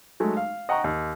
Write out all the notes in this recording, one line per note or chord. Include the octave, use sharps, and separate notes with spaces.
F#3 G#3 A3
F5
D#5 F#5 G5 A#5 C#6
D#2